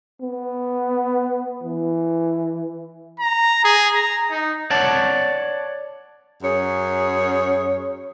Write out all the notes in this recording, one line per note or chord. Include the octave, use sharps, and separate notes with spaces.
B3
E3
A#5
G#4
A#5
D#4
C#5 D5 F#5 A5
F#2 G#4 C#5